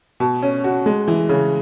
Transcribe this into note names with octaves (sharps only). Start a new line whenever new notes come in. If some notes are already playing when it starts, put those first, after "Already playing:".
B2
C#4
F#4
G#3
E3
C#3